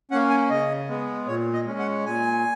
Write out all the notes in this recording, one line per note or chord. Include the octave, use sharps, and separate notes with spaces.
A#3 C#4 F#5
G#5
C#3 D#5
G#3 B3
A#2 C#5
D#5
G#3 C#4
F#5
A#2 G#5